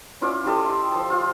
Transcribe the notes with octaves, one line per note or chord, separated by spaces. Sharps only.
C#4 E4 F4 D5
E4 G4 A4 D#5
C6
F3 A5
F4 F5